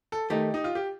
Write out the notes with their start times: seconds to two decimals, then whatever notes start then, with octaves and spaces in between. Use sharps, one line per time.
0.12 A4
0.30 D#3 A3 D#4 G4
0.54 D#4
0.64 F4
0.75 G4